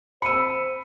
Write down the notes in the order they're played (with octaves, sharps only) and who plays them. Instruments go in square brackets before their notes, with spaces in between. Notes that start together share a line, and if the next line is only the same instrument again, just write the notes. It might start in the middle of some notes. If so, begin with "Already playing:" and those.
[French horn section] C5 [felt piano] B5 E6 [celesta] C#7 D#7